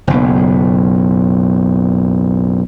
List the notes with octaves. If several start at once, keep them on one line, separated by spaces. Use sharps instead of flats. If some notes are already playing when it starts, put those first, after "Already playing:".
F#1 B1